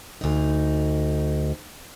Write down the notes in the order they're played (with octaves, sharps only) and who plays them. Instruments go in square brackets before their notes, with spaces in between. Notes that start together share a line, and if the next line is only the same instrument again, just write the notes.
[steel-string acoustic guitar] D2 D#4